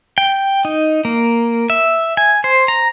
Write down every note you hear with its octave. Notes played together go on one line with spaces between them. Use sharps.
G5
D#4
A#3
E5
G#5
C5
A#5